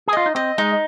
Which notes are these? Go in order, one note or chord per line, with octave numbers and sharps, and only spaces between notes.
G#4
F4 D#5
D#4
C4 D#5
G#3 D#4